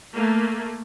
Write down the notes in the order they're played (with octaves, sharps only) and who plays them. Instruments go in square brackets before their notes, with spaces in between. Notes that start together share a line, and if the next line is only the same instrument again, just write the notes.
[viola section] A3 A#3